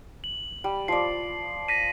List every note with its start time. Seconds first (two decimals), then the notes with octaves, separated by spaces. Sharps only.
0.24 F#7
0.64 G3
0.88 F3 D5 C7
1.68 A#6 B6 D#7